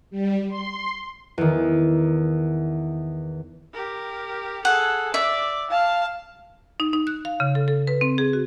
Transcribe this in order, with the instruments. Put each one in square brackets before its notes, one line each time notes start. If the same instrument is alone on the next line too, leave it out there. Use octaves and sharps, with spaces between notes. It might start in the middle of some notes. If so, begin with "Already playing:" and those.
[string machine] G3
C6
[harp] E2 D#3
[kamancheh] G4 A#4
[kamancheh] G#4 A4 [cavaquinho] F#5
[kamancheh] D5 [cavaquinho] E5
[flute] F5 [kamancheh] A5 F6
[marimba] D#4
D#4
F#6
F5
C#3
A4
A4
B4
C4
G#4
F#4